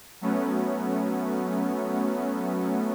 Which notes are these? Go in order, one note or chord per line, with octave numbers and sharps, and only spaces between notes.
F#3 A3 B3 C#4